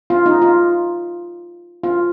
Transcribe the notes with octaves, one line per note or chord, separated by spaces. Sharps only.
F4
D#4
F4
F4